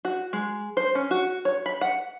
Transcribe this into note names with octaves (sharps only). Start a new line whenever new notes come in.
F#4
G#3
C5
C#4
F#4
C#5
B5
F#5